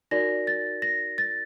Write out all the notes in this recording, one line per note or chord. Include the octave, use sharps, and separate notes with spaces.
D#4 F#4 A#4 D5 A#6
A6
A#6
A6